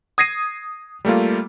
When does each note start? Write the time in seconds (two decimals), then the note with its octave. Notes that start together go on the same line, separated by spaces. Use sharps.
0.18 D#6 G#6 A#6 C7 D#7
1.05 G3 A3 A#3 F4